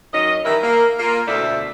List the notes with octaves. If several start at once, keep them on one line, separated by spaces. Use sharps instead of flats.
F#2 D#3 C#5 D#5
D#3 E3 G3 E4 A#4
A#3 A#4
A#3 F4 A#4
D2 B2 A3 C5 D5 E5